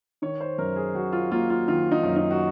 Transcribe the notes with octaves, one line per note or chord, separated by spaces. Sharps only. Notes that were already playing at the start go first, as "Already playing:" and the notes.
D#3 C#5
C5
F#2 A#4
G#4
F#2 F#4
F4
A#3 F4
F4
D#3 F4
D#4
F#2
D#4
F#4